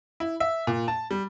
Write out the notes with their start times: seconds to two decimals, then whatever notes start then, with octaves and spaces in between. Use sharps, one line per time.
0.20 E4
0.40 E5
0.67 A#2
0.88 A5
1.11 G3